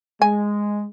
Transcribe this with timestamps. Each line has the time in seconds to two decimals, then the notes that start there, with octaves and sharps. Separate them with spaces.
0.22 G#3 G#5